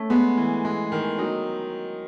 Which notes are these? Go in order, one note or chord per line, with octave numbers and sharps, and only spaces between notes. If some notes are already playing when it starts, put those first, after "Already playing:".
Already playing: A3 C#4
G#3 B3
E3
G#3
D#3
F#3 D#4